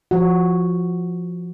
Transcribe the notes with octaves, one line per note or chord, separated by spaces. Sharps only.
F3 F#4